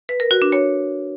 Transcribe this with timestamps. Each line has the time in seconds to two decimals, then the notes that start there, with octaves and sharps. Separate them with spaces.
0.09 B4
0.20 A#4
0.31 F#4
0.42 D4
0.52 C#5